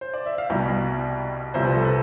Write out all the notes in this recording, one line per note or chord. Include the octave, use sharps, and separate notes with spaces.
C5
D5
E5
F5
C2 B2 G3 G5
C2 C3 F3 C5
B4
A4
B4